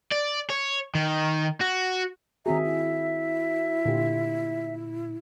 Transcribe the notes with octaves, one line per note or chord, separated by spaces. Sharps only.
D5
C#5
D#3
F#4
D#3 C4 F#4 G#4 E5 A#5
E4
A#2 D3 F4 G4